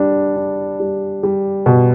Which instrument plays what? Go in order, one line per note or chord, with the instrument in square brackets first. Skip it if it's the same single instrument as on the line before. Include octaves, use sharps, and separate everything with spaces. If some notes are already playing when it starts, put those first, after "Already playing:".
Already playing: [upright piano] G3 D4
D4
G3
G3
B2